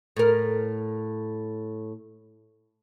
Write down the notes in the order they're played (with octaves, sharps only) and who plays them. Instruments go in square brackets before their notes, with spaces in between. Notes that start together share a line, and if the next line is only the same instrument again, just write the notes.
[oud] A2 A#4